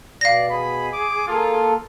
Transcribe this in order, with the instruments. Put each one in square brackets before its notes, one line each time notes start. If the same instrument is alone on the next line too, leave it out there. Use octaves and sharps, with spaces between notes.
[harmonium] B2 [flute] D5 [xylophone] F5 A#6
[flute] G#4 [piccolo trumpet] B5
[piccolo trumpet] D6
[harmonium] A#3 A4 [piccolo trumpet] F4